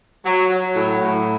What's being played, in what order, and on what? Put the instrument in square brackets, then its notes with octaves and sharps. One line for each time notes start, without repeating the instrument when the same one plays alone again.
[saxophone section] F#3
F#3
A2
A2